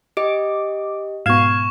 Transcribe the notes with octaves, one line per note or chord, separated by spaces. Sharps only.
G4 D#5 D6
G#2 B2 B3 F5 C#6 G#6 E7